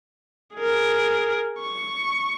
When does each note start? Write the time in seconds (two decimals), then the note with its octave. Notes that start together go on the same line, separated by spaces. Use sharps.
0.56 G#4 A#4
1.60 C#6